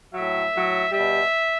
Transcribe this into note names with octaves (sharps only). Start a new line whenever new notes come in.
A2 F#3 E5
A2 F#3
B2 G3 E5